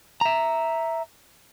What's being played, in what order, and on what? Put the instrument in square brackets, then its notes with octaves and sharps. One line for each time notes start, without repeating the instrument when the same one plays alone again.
[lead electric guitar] E5 A#5